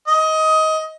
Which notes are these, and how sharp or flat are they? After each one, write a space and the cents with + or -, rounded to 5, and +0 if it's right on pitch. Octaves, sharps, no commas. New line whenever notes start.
D#5 +20